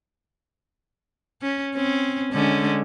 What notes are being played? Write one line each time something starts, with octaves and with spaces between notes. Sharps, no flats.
C#4
C4 C#4
D3 G#3 C#4